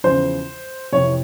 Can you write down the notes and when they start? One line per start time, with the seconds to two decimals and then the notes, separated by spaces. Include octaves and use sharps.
0.04 E2 C#3 F3 C5
0.93 F2 C3 E3 C#5